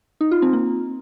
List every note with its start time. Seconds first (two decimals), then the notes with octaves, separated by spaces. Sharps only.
0.21 D#4
0.31 F4
0.42 C4
0.53 A#3